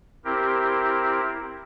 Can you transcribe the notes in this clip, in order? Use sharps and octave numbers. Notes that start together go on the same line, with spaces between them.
C4 E4 G4 A#4